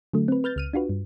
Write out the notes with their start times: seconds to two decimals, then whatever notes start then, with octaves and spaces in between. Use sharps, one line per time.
0.13 D3 F#3 A3
0.28 C4 B4
0.44 B4 F6 G6 A6
0.56 C#2 F6 D#7
0.73 D4 F4 F#4 B4
0.89 G2